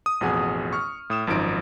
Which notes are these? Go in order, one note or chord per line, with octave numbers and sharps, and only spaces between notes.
D#6
A1 F2 B2 G#4 F#5 G#5
C#6 F6
A2 D#6 E7
G#1 F#2 F3 D#4 D7